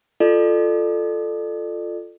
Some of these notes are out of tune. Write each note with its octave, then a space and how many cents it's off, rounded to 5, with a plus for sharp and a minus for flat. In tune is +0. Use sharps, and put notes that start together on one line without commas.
F4 +0 A4 +0 D5 +35